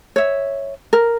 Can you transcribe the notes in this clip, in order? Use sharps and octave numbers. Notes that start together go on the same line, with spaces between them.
C#5 E5
A#4